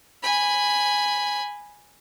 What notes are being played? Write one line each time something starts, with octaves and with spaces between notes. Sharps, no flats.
G#5 B5